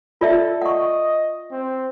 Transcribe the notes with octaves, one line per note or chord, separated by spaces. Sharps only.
F4 A4 D5 E5
D#5 F#5 C#6
C4